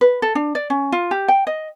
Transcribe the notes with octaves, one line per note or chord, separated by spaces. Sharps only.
B4
A4
D4
D5
C#4
F4
G4
G5
D#5